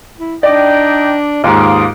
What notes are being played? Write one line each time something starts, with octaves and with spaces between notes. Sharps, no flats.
E4
D4 D#4 D5 D#5 G5
D#2 G#2 F4 F5 D6 D#6